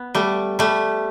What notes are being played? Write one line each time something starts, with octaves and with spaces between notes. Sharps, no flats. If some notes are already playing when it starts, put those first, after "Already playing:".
Already playing: B3
G3 A3
G3 A3